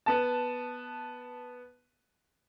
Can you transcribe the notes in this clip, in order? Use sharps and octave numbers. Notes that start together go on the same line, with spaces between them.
B3 A5